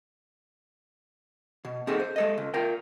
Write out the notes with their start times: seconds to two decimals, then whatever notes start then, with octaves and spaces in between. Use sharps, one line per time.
1.65 B2
1.87 C4 D#4 F#4 G#4 A4
2.00 C5
2.16 G#3 A4 D#5
2.38 C#2
2.54 F4 A#4 G5